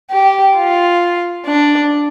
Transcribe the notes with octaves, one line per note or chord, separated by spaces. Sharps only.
G4
F4
D4